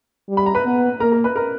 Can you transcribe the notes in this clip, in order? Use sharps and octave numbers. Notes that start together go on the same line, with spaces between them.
G3
B5
A#5
B4 B5
B3
A#3 A#4 A#5
A#4 A#5
B4 B5
A#4 A#5